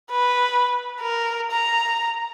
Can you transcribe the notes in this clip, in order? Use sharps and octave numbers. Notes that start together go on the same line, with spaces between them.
B4
A#4
A#5